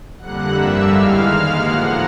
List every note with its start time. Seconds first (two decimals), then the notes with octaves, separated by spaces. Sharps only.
0.17 F2 D3 G3 A#3 F#5 F#6
0.52 G2 D3 G3 A#3 E5 E6
0.88 G#2 E3 G#3 F5 F6
1.23 D#2 D#3 G#3 F5 F6
1.58 A2 F3 A#3 F#5 F#6